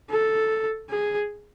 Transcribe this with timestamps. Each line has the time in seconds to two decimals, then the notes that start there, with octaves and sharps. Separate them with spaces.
0.10 A4
0.90 G#4